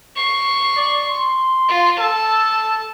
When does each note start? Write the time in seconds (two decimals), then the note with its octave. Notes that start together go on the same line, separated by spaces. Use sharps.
0.16 C#6 C7
0.77 D5
1.09 C6
1.69 F4
1.99 A4 A5